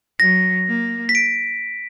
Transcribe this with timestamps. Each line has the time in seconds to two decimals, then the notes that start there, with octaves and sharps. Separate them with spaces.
0.20 F#3 A#6
0.68 A#3
1.09 B6
1.15 D7